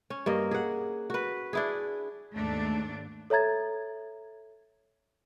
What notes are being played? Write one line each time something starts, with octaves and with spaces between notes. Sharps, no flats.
C#4
G2 A#3 D#5
G#4 F#5
F#4 B4
D4 E4 G#4
D#2 G#2 A3 D4
A4 C#5 E5 A#5 G#6 A6